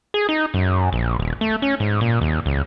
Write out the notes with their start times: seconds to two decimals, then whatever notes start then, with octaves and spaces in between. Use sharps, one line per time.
0.14 G#4
0.29 D#4
0.54 F#2
0.93 A#1
1.19 D#1
1.41 A3
1.62 C#4
1.80 G#2
2.01 A#2
2.21 D#2
2.46 C#2